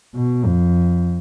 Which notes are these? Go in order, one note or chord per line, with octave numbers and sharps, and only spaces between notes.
B2
F2